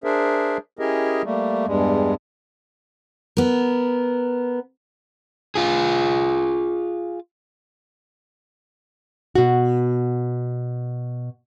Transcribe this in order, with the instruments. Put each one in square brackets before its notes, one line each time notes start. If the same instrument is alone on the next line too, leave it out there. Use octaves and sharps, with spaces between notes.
[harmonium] D4 G#4 A#4 C5 E5
C#4 E4 G4 G#4 A#4 D#5
G3 A3 A#3
E2 G2 G3 G#3
[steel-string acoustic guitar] B3 A#4
[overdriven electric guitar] F4 G#4
[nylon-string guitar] B2 F#4